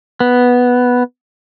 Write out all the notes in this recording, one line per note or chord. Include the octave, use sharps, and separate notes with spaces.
B3